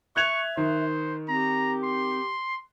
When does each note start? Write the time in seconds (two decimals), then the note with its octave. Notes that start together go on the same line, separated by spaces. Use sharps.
0.16 E5 C#6 F#6 G#6 F7
0.57 D#3 C5
1.28 C4 G4 A#5
1.83 C6